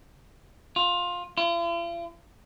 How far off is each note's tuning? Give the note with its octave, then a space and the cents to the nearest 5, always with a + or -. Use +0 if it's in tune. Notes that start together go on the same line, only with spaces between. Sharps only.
F4 +15
F4 -45